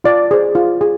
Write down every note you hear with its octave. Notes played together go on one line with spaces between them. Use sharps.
F4 D5
G#4 C5
F4
G#4